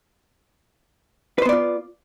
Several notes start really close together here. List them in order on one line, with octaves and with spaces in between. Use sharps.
B4 C5 B3 D5 F4